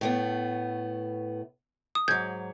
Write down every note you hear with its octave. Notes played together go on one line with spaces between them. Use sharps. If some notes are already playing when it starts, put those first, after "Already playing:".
A2 A3 B3
D#6
G#2 F#3 G6 G#6